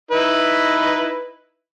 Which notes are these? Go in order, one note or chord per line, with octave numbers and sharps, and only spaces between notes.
D#4 E4 B4